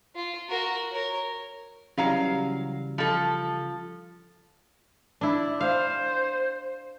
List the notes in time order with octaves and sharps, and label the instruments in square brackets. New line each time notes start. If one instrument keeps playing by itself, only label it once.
[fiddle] F4
F#4 A#4
A#4 C#5
[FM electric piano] C#3 E3 G3 [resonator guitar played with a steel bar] F#3 F5 A#5
[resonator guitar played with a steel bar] F3 A4
[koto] D4 E4
[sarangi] C5 [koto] F5